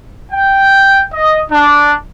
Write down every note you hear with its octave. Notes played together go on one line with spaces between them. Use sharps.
G5
D#5
D4